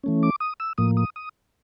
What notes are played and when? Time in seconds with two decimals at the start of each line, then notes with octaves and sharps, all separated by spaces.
0.04 E3 A3 C#4
0.23 D6
0.40 D#6
0.60 E6
0.78 A2 F3 A#3 D#6
0.97 D#6
1.16 D#6